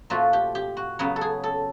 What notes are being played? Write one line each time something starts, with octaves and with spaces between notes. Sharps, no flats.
A#2 F3 A3 F#4
G4
G4
F#4
C#3 F#3 B3
A4
G#4
A4